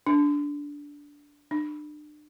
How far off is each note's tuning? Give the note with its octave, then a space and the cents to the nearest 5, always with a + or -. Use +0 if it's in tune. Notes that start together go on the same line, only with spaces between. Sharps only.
D4 -15
D4 +35